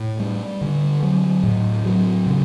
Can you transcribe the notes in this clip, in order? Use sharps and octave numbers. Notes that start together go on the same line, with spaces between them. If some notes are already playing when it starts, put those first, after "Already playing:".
Already playing: A2
G3
D3
F#3
A2
F#3
C#3